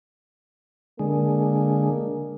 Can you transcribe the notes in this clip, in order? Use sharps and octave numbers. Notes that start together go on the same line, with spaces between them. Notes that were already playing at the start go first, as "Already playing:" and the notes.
D3 G#3 A#3